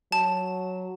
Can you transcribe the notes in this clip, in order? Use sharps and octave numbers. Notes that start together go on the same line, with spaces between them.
F#3 A5